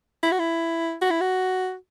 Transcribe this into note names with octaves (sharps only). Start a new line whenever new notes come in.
E4
F#4
E4
F#4
E4
F#4